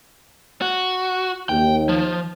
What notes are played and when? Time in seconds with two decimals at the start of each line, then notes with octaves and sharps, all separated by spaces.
0.62 F#4
1.49 D#2 G5
1.89 F3